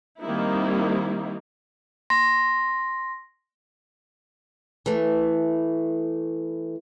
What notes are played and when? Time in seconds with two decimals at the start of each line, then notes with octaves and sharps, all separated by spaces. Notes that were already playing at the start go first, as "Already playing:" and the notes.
0.20 D#3 G3 A#3 C4 D#4 E4
2.10 C6 A#6
4.86 E3 A3